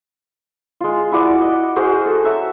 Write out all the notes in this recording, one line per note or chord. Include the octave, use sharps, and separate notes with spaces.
G#3 F4
E4 F#4 D5
D#5
F#4 G#4 A#4 C5
A4
C#5 E5 A#5